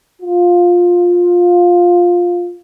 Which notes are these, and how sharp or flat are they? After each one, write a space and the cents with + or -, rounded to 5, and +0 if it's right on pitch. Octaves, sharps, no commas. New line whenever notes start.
F4 +10